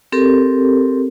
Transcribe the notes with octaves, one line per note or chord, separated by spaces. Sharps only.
C4 G4 A4 A#4